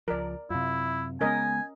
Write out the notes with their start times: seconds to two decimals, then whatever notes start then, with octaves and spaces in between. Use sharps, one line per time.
0.08 C#2 F3 A#4 D5
0.50 F#2 C3 E4 F4
1.21 C#3 G#3 B3 C#4 A#4 D#5 G#5